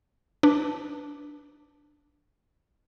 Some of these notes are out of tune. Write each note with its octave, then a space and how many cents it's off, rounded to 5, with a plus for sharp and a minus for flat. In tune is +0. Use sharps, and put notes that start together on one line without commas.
D4 +0 B4 -10